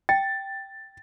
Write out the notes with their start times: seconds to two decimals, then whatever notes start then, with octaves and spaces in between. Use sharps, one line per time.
0.09 G5 A6